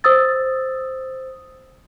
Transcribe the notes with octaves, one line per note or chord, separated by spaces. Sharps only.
C5 D#6 E6 A6